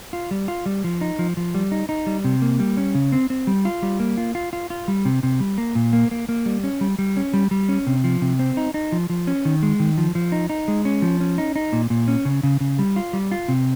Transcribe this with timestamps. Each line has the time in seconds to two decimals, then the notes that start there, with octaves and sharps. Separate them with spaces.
0.13 F4
0.31 G3
0.48 F4
0.66 G3
0.84 F3
1.01 D#4
1.19 F3
1.37 F3
1.55 G3
1.72 D#4
1.89 D#4
2.06 G3
2.24 C3
2.42 A#3
2.59 G3
2.77 C#4
2.95 C#3
3.12 C4
3.30 C4
3.47 G3
3.65 F4
3.82 G3
4.00 A#3
4.18 F4
4.35 F4
4.53 F4
4.70 F4
4.88 G3
5.05 C3
5.23 C3
5.40 G3
5.58 A#3
5.75 A#2
5.93 A#3
6.11 A#3
6.29 A#3
6.46 G3
6.64 C#4
6.81 G3
6.99 G3
7.17 C#4
7.33 G3
7.51 G3
7.69 C#4
7.87 C3
8.04 F3
8.22 C3
8.39 C4
8.57 D#4
8.74 D#4
8.92 F3
9.10 F3
9.27 C#4
9.45 D#3
9.63 G#3
9.80 D#3
9.98 F3
10.15 F3
10.32 D#4
10.49 D#4
10.68 G#3
10.85 C#4
11.02 F3
11.20 C#4
11.38 D#4
11.56 D#4
11.72 A#2
11.90 A#2
12.08 C#4
12.25 C#3
12.43 C#3
12.60 C#3
12.79 G3
12.96 F4
13.13 G3
13.31 F4
13.48 C3